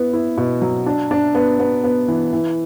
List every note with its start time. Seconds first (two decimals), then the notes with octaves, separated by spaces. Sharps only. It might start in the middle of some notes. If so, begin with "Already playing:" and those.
Already playing: B3 E4
0.13 E4
0.38 B2
0.62 F#3
0.86 D4
1.11 D4
1.35 B3
1.59 B3
1.84 B3
2.08 E3
2.33 E3